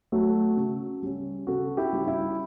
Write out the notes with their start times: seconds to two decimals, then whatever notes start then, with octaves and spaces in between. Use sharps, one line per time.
0.12 F#3 A3
0.57 C#3
1.03 G3 C#4
1.47 C#3 F#4 A4
1.77 E4 G4
1.93 G3 C#4
2.08 E4